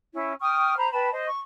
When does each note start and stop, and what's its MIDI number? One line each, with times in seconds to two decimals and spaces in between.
0.13 0.32 61
0.13 0.32 64
0.40 0.74 79
0.40 0.74 85
0.40 0.74 87
0.40 0.74 89
0.76 0.90 72
0.76 0.90 82
0.76 0.90 83
0.91 1.09 71
0.91 1.09 79
0.91 1.09 81
0.91 1.09 83
1.11 1.25 72
1.11 1.25 75
1.26 1.41 85